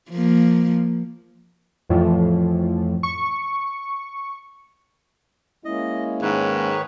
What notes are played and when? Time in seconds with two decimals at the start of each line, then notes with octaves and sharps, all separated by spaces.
0.10 F3 A#3
1.90 F2 A2 E3 F3
3.03 C#6
5.65 G#3 A#3 C#4 E4 D#5
6.22 G#2 D#3 B4 C#5